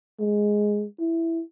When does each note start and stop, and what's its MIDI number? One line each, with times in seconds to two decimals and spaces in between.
0.20 0.85 56
1.00 1.43 64